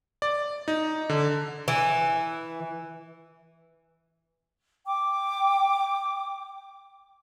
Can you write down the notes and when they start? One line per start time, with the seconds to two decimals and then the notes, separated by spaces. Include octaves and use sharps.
0.22 D5
0.68 D#4
1.09 D3
1.68 E3
4.86 G5 D6